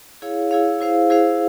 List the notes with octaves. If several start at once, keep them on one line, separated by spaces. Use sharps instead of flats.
E4 G#4 C#5 F5
E4 G#4 C#5 F5
E4 G#4 C5 F5
E4 G#4 C5 F5